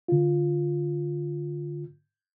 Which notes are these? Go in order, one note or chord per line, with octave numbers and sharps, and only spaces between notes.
D3 F4